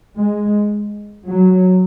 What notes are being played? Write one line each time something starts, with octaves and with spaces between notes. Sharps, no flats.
G#3
F#3